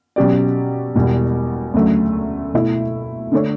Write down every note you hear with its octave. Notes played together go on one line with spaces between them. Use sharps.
B2 F#3 C#4 G4 D5
E1 E2 B2 G3
D2 C#3 F#3 A3
B2 A3 E4
D3 A3 D4 A4 C#5